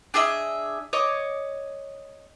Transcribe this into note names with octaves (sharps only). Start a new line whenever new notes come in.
D4 G#4 D#5 E5
C#5 D#5 D6